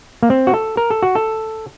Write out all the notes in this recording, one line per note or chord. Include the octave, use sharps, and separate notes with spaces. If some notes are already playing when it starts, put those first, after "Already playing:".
A#3
C4
F#4
A4
A#4
A4
F#4
A4